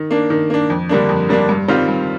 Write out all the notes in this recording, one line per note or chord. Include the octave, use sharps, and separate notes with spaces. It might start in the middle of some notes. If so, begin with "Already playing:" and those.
Already playing: D#3
A#3 D4
D#3
A#3 D4
F2
D3 G3 A#3 D4
F2
D3 G3 A#3 D4
G2
D#3 G3 C4 F4
G2